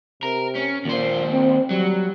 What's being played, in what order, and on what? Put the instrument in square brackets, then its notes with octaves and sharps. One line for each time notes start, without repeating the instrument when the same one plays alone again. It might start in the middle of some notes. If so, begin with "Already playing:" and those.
[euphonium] C3 [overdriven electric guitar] A#4
[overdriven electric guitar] C#4
[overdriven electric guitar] D#2 C5 [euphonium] A#2
[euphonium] C4
[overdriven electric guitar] F#3 [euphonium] G3